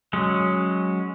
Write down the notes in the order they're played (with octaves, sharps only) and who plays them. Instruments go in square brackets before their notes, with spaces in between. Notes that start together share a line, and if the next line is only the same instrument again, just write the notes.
[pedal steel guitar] F#3 G#3 C#4